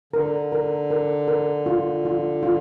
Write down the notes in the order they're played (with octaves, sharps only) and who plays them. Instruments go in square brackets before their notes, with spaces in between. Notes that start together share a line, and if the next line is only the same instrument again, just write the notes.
[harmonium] D3 [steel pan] A#4
[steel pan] A#4
A#4
A#4
F4
F4
F4